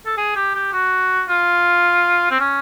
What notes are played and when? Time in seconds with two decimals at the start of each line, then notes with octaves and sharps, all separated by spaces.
0.06 A4
0.17 G#4
0.36 G4
0.55 G4
0.73 F#4
1.29 F4
2.31 C4
2.40 C#4